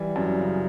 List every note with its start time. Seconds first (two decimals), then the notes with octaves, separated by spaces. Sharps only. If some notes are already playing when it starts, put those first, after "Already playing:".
Already playing: E3 G3
0.16 F#2
0.40 C#3